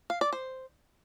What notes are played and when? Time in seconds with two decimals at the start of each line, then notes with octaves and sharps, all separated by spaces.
0.10 F5
0.21 D5
0.33 C5